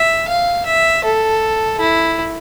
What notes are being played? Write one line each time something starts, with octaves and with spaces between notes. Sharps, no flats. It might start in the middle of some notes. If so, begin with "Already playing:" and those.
Already playing: E5
F5
E5
A4
E4